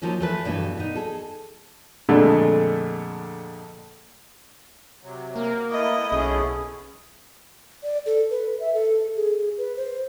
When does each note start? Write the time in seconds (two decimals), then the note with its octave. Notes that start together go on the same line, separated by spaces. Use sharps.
0.02 D#3 F3 F#3 A#3 C#4
0.20 E3 A3 B4
0.45 G2 B2 E3
0.77 B3 D#4
0.95 G#4 A4
2.09 F2 A#2 D3 G#3 A3 D4
5.03 C3 F#3
5.36 A#3 A#4
5.71 A3 B3 E4 D#5
6.12 B1 C#4 G#4
7.83 D5
8.06 A4
8.30 B4
8.60 E5
8.74 A4
9.16 G#4
9.58 B4
9.77 C5